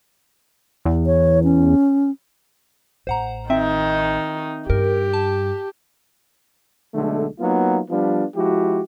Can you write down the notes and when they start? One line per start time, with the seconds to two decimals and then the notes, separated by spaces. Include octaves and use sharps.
0.85 E2
1.06 C#5
1.44 C#4
3.07 A1 C5 F#5 A#5
3.50 D#3 C4 D#4 E5
4.70 G2 G4 A#4
5.13 A5
6.94 B1 D3 G#3 A3
7.39 F#3 A#3 B3 D#4 F4
7.89 F3 G3 B3 D4 F4
8.35 F3 G#3 E4 F#4 G4